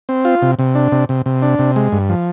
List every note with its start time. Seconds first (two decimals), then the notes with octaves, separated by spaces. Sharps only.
0.09 C4
0.25 F4
0.42 C3
0.59 C3
0.75 D4
0.92 C3
1.09 C3
1.26 C3
1.42 D4
1.59 C3
1.76 G#3
1.92 G2
2.09 F3